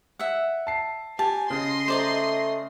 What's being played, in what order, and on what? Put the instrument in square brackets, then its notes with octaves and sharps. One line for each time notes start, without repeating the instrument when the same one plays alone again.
[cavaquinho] E5 F#5
[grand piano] A5 C7
[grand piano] G4 [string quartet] G#5 [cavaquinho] A5
[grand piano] C#3 [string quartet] D#5 C6
[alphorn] A3 [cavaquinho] C5 D5 A#5